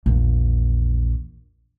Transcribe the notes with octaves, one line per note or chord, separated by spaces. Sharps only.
A#1 E2